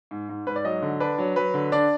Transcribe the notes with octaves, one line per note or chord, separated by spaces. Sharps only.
G#2
G#2
G#2 B4
D5
F#3 D#5
D3
D4 B4
F#3
F#3 B4
D3
D4 D5